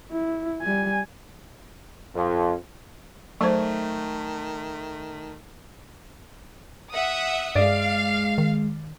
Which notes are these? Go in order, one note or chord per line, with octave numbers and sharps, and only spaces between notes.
E4
G3 G#5
F2
D#3 F#3 A3 C5
E5 F#5 D#6
G2 G#3 D5 F5
D#3